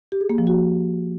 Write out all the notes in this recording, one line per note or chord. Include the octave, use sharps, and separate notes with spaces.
G4
G#4
A#3
F3
F#4